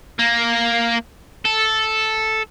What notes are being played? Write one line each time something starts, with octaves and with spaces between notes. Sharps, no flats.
A#3
A4